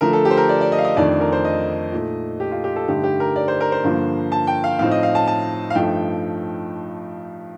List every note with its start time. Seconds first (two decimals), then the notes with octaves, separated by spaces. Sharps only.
0.01 D3 F3 A3 A#4
0.13 A4
0.25 G4
0.31 C5
0.37 A#4
0.49 D5
0.61 D5
0.72 D#5
0.79 F5
0.85 D#5
0.97 F2 D#3 A3 D4 D5
1.20 A#4
1.32 C5
1.45 D#5
1.92 A#2 A3 D#4
2.40 G4
2.52 F4
2.64 G4
2.76 A4
2.88 G2 D3 A3 D#4 G4
3.04 G4
3.20 A#4
3.36 D5
3.48 C5
3.61 A#4
3.72 C5
3.84 G2 D3 F3 A#3
4.32 A5
4.47 G5
4.64 F5
4.79 A2 F3 C4 D#4 F5
4.91 D#5
5.03 F5
5.15 A5
5.27 A5
5.70 F5
5.75 G2 F3 A3 D#4 G5